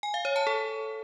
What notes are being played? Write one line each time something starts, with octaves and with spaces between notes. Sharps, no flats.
G#5
F5
C#5
A5
A4